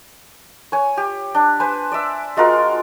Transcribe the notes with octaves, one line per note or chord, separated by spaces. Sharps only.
C#5 G#5
G4
D4
B4 C5 G#5
D5 E5
G#3 F4 F#4 A#4